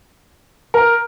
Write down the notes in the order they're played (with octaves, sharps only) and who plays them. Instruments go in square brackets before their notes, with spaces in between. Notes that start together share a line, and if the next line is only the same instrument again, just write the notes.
[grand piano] A#4